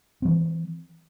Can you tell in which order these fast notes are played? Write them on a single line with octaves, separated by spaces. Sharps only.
C4 F#3 E3